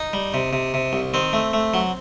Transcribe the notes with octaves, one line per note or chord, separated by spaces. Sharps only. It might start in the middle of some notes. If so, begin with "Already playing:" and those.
Already playing: D#4
G3
C3
C3
C3
C2
D#3 C4
A3
A3
F#3